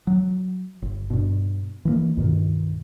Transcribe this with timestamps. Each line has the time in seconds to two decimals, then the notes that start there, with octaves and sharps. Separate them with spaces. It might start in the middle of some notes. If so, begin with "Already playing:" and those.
0.07 F#3
0.82 G1
1.10 G2 B2
1.85 E3 F#3 A#3
2.17 C#2 G2 B2 D#3